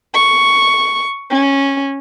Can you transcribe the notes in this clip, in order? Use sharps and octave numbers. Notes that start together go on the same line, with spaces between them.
C#6
C#4